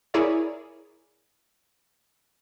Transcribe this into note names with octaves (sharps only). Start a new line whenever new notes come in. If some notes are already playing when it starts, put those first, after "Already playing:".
E4 G#4 A#4 C#5 D5 E5